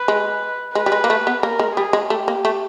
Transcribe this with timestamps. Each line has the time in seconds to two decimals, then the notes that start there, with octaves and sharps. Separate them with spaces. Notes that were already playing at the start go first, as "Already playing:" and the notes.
Already playing: B4
0.08 G#3
0.75 G#3 B4
0.86 G3
0.92 G#3
1.04 A#3
1.10 A3
1.27 B3
1.43 A#3 A#4
1.59 G#3
1.76 G3 G#4
1.93 G#3
2.10 A3 G4
2.28 A#3
2.45 A3